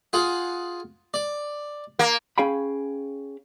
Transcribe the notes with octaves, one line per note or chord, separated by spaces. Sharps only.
F4 G#4 F#5
D5
A#3
C#4 G#4 F5 G5 B5